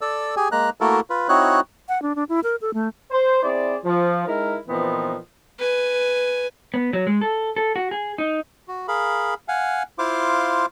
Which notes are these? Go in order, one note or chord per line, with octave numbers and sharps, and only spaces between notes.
A4 D5 E6
G4 G#4 G#5
G#3 A#3 A#5 F#6
A3 A#3 E4 F#4 A4 A#4
F4 B4
C4 D#4 E4 F#4 C#5 F#6
F#5
D4
D4
E4
A#4
A4
A3
C5
C4 E4 G#4 C5 D5
F3
G#3 D#4 E4 A#4
A#2 E3 F3 B3 C4 D#4
B4 G#5
B3
F#3
G#3
A4
A4
F#4
G#4
D#4
F#4
G#4 A#4 F5 B5
F5 F#5 G#5
E4 F4 C5 F5 C6 D6